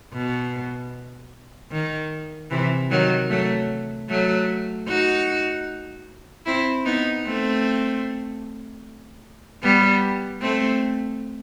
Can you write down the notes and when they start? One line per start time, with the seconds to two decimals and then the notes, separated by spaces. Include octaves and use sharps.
0.13 B2
1.72 D#3
2.50 C3 E3
2.91 D#3 F#3
3.30 F#3 A3
4.09 F#3 A3
4.88 D#4 F#4
6.46 C4 E4
6.86 B3 D#4
7.26 A3 C4
9.63 G3 B3
10.41 A3 C4